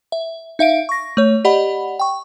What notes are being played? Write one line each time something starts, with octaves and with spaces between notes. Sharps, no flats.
E5
D#4 E5 F5 D7
C#6 A#6
A3 C#5
G4 D5 D#5 F#5 B5
G5 C#6